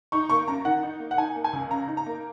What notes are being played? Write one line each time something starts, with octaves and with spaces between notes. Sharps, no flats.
D#4 C#6
A#3 C#6
F#2 A#5
D#3 F#5
D#4
A#3
F#5
D#4 G#5
A#3
G#5
C#2
C#3 A#5
D#4
A#5
A#3